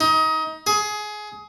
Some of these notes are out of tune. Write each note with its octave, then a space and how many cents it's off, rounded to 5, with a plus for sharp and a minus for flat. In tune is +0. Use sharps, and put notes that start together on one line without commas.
D#4 +25
G#4 +20